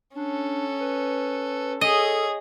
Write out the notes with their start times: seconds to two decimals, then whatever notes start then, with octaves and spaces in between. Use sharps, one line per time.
0.16 C#4 D4 A4
0.80 B4
1.81 G#4 A4 C#5 D#5